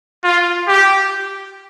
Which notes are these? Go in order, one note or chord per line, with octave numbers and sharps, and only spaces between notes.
F4
G4